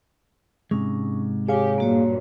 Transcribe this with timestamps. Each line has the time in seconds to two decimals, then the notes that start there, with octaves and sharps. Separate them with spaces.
0.71 G#2 C3 G#3 C#4
1.49 G4 G#4 C#5 F5 G#5
1.78 G2 A#2 A#3 F#4 C#5